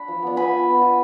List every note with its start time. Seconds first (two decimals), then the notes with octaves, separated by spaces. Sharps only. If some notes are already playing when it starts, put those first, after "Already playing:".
Already playing: D4 B5
0.08 F3
0.22 B3 D4
0.37 B3 G#5 B5
0.52 F4
0.67 B3
0.82 F4